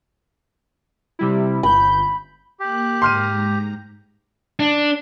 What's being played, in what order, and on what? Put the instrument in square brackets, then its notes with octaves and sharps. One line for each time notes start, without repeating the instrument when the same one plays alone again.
[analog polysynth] C3 G3 E4
[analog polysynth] G1 G6 [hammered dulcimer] B5
[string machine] A#3 F#6 [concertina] G4
[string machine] G#2 A#5 [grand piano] C6 F6 D#7
[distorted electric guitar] D4